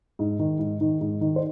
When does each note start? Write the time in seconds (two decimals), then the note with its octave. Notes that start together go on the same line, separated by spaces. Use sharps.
0.19 G#2
0.39 D#3
0.59 G#2
0.81 D#3
1.01 G#2
1.21 D#3
1.36 C5